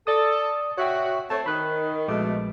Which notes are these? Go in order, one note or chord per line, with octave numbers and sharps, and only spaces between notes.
A4 D5 D#6
F#4 C#5 E5 G5
A3 C4 C#5 A5
D#3 B5 F#6
A#1 B2 G#3 A3 D6